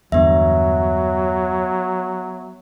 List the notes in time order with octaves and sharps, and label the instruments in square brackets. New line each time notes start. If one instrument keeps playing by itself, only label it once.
[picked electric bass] E2 G2 D3 [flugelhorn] F#3 [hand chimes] B3 E5